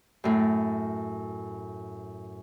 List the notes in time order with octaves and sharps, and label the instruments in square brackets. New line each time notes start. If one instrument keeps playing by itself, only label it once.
[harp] F#2 A2